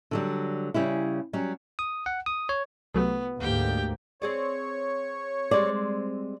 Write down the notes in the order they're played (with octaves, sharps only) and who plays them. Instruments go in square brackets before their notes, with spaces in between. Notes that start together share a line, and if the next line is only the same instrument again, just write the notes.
[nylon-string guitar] D3 F#3 G3
C#3 G3 C#4 E4
F#3 G3 C#4
[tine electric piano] D#6
F#5
D#6
C#5
[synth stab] C2 F#3 A3 [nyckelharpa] B3
[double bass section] D2 G#2 A#3 [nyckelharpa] G4 G5
[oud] C4 G#4 D5 [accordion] C#5
[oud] G3 G#3 C4 [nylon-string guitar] D5